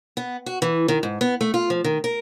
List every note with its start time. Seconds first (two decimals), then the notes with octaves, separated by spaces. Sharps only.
0.17 B3
0.46 F#4
0.62 E3
0.88 D#3
1.03 G#2
1.21 B3
1.41 A3
1.54 F4
1.70 F3
1.84 D#3
2.04 A#4